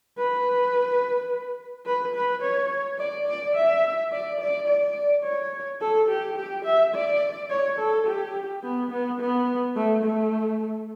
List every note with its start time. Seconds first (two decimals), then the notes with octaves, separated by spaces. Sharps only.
0.18 B4
1.86 B4
2.15 B4
2.42 C#5
2.99 D5
3.27 D5
3.56 E5
4.12 D5
4.40 D5
4.68 D5
5.24 C#5
5.81 A4
6.09 G4
6.37 G4
6.65 E5
6.95 D5
7.51 C#5
7.79 A4
8.07 G4
8.63 B3
8.91 B3
9.20 B3
9.76 A3
10.04 A3